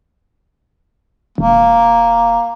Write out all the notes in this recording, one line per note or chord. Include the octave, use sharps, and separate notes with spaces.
E1 A#3